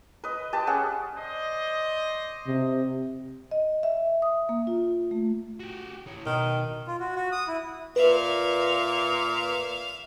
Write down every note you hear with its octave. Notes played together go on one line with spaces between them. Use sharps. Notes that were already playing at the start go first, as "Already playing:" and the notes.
B4 D#5
G4 B4 A5
C#4 G#4 F#5
C5 D5 D#5
C3
D#5
E5
D#6
A#3
F4
A3
F#4 G4
E3 C#5
B2 D#3
F4
F#4
F#4
D#6
E4
A#2 B4 E5 F5